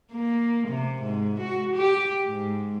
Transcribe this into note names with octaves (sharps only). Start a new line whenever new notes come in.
A#3
C3
G#2
F#4
G4
G#2